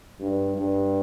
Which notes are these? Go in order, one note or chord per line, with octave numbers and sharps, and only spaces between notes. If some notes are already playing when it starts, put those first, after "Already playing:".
G2
G2